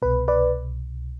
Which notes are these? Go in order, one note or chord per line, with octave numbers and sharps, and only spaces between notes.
C2 B2 B4
B4 D5